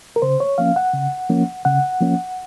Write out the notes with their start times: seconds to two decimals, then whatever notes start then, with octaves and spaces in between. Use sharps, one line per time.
0.16 A#4
0.22 C#3 C5
0.40 C#5
0.58 F3 A#3 C#4 F5
0.76 F#5
0.94 C#3
1.29 F3 A#3 C#4
1.65 C#3 F#5
2.01 F3 A#3 C#4